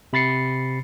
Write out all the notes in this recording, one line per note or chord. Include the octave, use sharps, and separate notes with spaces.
C3 B5 A6 C7 C#7